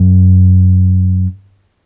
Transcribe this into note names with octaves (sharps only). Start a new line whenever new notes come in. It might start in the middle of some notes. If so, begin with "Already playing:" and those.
Already playing: F#2